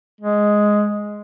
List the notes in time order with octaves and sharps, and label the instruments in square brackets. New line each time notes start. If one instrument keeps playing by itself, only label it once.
[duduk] G#3